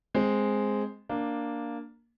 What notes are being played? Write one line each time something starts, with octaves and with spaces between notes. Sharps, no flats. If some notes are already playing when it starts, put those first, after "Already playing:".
G#3 C4
A#3 D4